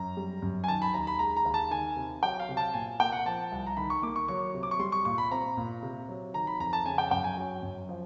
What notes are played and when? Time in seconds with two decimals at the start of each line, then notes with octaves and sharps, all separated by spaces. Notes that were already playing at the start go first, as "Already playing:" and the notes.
Already playing: F#2 A#5
0.17 G3
0.42 F#2
0.64 G#5
0.68 D#3 A5
0.82 B5
0.94 D#2 A#5
1.07 B5
1.19 G#3 A#5
1.36 A#5
1.45 D#2
1.54 A5
1.71 D#3 G#5
1.96 C3
2.23 F#3 G5
2.40 F5
2.49 C3
2.57 A5
2.74 A#2 G#5
3.00 A#3 G5
3.12 F#5
3.26 F3 A5
3.52 C2
3.66 A#5
3.77 D#3 B5
3.90 C#6
4.03 A#3 D6
4.16 C#6
4.28 F#3 C#6
4.54 C3
4.63 D6
4.71 C#6
4.79 G3 C6
4.92 C#6
5.05 A#2 C#6
5.18 B5
5.31 C4 A#5
5.57 A#2
5.83 C3
6.09 F#3
6.34 D#3 A#5
6.47 B5
6.60 F2 A#5
6.73 A5
6.86 C#3 G#5
6.98 G5
7.11 F#2 G5
7.24 G#5
7.37 F#3
7.63 F#2
7.89 F3